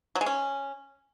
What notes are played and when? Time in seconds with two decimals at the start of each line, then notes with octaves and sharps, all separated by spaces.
0.15 F#3
0.21 G#3
0.26 C#4